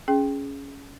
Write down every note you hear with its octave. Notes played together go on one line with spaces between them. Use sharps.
C#4 G#4 G5